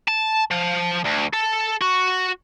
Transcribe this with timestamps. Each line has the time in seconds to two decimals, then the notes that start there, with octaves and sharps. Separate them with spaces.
0.08 A5
0.51 F3
1.05 D2
1.34 A4
1.81 F#4